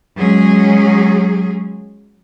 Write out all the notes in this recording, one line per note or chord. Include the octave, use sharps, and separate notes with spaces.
F#3 G#3 C#4 G#4